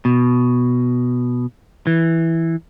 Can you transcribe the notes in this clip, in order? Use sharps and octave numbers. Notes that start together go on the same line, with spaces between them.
B2
E3